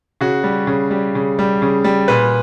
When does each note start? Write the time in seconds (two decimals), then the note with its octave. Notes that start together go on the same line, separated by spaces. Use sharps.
0.21 C#3 F#4
0.44 G3
0.67 C#3
0.91 G3
1.15 C#3
1.39 G3
1.62 C#3
1.84 G3
2.08 A#2 B4